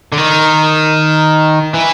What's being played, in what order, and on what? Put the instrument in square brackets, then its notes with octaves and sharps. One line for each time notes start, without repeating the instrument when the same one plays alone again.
[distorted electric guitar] D3
D#3
E3